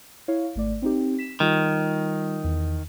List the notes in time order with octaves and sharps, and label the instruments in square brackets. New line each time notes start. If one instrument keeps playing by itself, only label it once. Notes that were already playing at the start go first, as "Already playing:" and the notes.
[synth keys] E4 C#5 F5
G#1 A3 D5
C4 D#4 G4
B6 E7
[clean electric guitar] D#3 [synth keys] G3 F4
[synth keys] E2